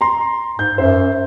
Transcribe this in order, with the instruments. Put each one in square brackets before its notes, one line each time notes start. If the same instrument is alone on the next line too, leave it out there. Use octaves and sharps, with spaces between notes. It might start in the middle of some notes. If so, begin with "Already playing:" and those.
[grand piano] A#5 C6
[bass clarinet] G#2 [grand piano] G6
[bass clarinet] F#2 [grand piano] C5 E5